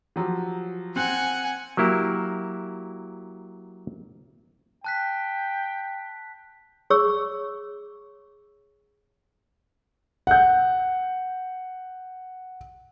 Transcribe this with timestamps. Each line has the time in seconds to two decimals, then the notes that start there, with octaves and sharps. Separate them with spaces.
0.16 F3 F#3 G4
0.96 C4 F#5 G#5 F#6 F#7
1.77 F#3 A#3 E4 G4
4.84 G5 A5 F#6 B6
6.90 G#4 C#5 C#6 E6
10.27 F#5 G6